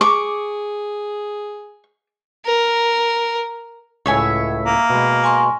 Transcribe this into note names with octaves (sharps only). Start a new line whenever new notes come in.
G#4 C#6 D6
A#4
C#2 A2 C#5 E5 G#5
A#3
B2 G#3
G#5 C6 C#6